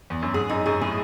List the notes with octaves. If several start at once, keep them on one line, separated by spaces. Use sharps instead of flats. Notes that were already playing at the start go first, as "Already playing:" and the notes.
E2
F#2
G#2 G#4
F#2 D#4
F#2 G#4
A2 G#4